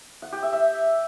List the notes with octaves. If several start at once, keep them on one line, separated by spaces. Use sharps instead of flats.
F#5
G4
E5
E5